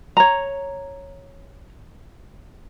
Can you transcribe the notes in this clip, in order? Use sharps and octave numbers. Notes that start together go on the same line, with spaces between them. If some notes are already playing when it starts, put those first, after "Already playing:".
C#5 A#5